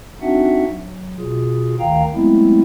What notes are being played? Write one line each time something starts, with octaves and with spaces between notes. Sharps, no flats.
C4 D4 D#4 F#4 E5 F#5
F#3
B2 F4 G#4
D2 D#3 F5 G5 A#5
F#3 G#3 A3 B3 C4 E4